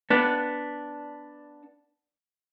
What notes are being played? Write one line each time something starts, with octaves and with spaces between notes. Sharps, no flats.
B3 D4